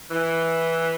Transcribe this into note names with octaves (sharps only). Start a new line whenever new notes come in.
E3